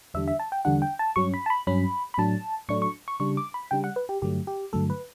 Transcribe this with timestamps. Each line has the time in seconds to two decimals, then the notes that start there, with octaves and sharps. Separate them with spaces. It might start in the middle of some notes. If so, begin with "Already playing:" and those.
0.14 E2 D3 G3 D4 E5
0.28 E5
0.39 A5
0.52 G5
0.65 E2 D3 G3 D4 F#5
0.82 G5
0.99 A5
1.16 G2 F#3 C#4 C#6
1.34 B5
1.46 A5
1.50 B5
1.67 G2 F#3 C#4 B5
2.14 B5
2.18 A2 F#3 A3 D4 A5
2.69 A2 F#3 A3 D4 C#6
2.82 C#6
3.08 C#6
3.20 C#3 G3 D4 C#6
3.37 D6
3.54 B5
3.71 C#3 G3 D4 G5
3.84 F#5
3.96 B4
4.09 G4
4.22 G2 D3 F#3 A3 G4
4.47 G4
4.73 G2 D3 F#3 A3 A4
4.90 B4